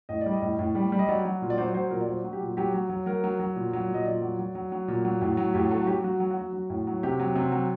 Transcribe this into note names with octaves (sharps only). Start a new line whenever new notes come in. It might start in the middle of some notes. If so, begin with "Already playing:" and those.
A2 D#5
D5
G3
D#5
A2
A2
G3
G3
D#5
F#3 D5
F#3
A#2
D5
F#3 C5
F#3 C5
A#2 A#4
D5
F#3 C5
F#3
G4
A#2
F#3 G4
F#3
F#3
F#3 A#4
F#3
F#3
A#2
F#3
A#2
D#5
A#2 D5
F#3
F#3
F#3
F#3
A#2
F#3
A2
F#3
A2 G4
F#3 A4
F#4
F#3 G4
F#3 F#4
F#3
F#4
F#3
F#3
A2
F#3
C3 G4
F#3
C3
F#3